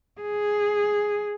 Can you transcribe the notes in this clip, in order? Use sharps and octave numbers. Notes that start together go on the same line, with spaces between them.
G#4